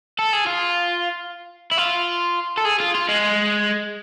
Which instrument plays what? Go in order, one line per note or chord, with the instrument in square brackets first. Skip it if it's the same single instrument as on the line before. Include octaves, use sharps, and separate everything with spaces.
[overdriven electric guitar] A4
G#4
F4
E4
F4
A4
G#4
F4
F4
G#3